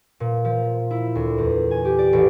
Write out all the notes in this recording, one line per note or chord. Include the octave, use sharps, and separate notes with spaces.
A#2
F3
E4
D2
E2
G#5
G4
D5
A1